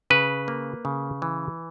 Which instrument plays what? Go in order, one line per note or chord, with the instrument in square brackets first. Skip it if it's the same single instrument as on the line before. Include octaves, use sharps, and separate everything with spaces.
[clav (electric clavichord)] C#3 B4
A#3
C#3
E3